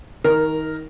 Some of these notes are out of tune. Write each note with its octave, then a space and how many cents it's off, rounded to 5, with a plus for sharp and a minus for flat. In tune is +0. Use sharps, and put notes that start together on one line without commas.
D#3 +25 A#4 +0